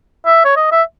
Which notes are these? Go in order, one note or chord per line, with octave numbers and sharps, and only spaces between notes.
E5
C#5
D#5
E5